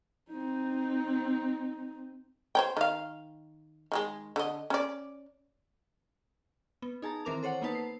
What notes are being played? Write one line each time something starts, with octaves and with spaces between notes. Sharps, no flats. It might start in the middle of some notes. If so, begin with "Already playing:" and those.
C4 D#4
C5 C#5 G5
D#3 F5
D#3 F#3 G#3
D3 D#5
C#4 D5
B3
D#4 G#4 A5 A#5
D#3 E3 C4 A#4 D6 F7
A4 C5 C#5 F#5
A#3 B3 D#4 B4 A5
C7